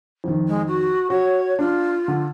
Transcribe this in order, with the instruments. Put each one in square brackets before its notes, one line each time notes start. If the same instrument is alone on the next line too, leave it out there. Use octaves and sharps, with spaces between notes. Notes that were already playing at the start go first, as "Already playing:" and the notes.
[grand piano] F2 D#3
[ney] G#3
F#4
[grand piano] F#4 [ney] C#5
[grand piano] D4 [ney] F4
[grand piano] D3